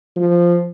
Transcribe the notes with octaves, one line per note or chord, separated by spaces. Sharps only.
F3